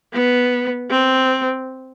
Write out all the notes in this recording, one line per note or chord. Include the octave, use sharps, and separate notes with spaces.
B3
C4